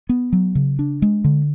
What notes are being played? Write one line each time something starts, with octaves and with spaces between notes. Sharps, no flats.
B3
F#3
C#3
D4
G#3
D3